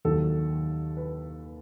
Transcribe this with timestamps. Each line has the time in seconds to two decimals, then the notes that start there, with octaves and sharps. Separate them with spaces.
0.05 D#2 D#3 F#3 A4
0.97 B4